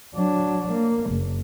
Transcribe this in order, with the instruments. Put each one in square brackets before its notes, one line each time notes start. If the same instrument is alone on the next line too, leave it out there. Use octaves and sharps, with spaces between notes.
[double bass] F#3 D4
A#3
F#1